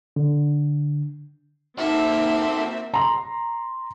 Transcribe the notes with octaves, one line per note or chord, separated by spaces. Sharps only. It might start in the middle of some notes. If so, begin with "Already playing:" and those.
D3
A#3 C4 D#4 F#4 A4 E5
A#5 C6